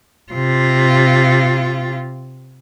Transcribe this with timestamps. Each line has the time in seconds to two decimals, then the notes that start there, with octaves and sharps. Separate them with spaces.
0.32 C3 F4